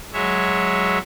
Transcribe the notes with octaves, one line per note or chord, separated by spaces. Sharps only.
F#3 G#3 C#5 E5